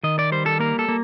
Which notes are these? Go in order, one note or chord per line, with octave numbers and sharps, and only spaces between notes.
D#3 D#5
D5
G3 C5
A4
A#3 A#4
A4
A#3